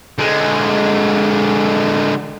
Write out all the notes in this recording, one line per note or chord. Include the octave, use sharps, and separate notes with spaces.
D3 G#3